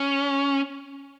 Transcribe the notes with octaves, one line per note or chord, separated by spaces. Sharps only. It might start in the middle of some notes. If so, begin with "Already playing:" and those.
Already playing: C#4